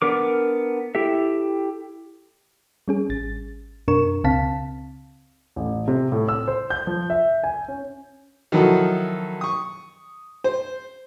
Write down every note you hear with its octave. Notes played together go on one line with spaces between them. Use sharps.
B3 D4 A#4 D6
E4 G4 A4 E5
G3 C#4 G#4
G#1 A6
F#2 B2 D4 A#4 C#6 E7
C#2 C#3 C4 F5 A5 B6
A1
C3
A2
E6
C5
G6
F3
E5
G#5
C#4
D#3 F3 F#3 E4 F#4 A4
C#6 D#6
C5